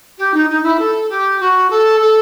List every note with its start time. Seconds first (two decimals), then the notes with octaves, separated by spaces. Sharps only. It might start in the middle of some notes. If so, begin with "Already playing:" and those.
0.18 G4
0.34 D#4
0.49 D#4
0.63 E4
0.79 A4
1.09 G4
1.40 F#4
1.70 A4
2.00 A4